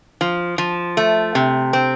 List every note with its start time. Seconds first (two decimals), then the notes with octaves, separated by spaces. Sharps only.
0.21 F3
0.58 F3
0.97 A3
1.35 C3
1.73 C4